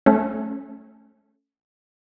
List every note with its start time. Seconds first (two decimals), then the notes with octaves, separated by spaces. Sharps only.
0.06 A3 C#4